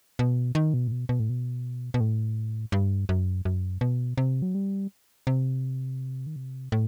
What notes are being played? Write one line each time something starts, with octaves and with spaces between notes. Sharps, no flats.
B2
D#3
B2
A2
B2
B2
A2
B2
B2
A2
G2
F#2
F#2
B2
C3
F#3
G3
C3
D#3
C3
A2